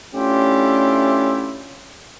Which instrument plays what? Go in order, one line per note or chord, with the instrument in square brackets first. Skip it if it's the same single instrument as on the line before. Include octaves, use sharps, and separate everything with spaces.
[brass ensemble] A3 C#4 D4 E4 F4 G4